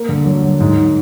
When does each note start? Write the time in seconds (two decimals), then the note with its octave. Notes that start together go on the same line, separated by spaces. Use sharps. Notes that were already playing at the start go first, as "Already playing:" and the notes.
Already playing: A#3
0.09 D3
0.26 F#3
0.43 F#3
0.60 G#2